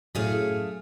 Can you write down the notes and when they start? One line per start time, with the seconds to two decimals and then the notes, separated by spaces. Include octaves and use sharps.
0.15 F#2 A2 A3 G#4 F5